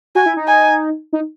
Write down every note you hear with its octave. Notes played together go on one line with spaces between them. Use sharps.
F#4 G#5
E4
D#4
G#5
D#4